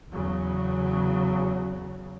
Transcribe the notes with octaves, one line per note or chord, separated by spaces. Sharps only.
E2 C#3 F#3